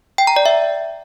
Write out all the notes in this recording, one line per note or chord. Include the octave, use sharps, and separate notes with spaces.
G5
A#5
D5
E5